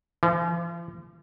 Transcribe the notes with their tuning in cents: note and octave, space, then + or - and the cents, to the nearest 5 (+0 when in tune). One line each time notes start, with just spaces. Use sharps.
F3 -45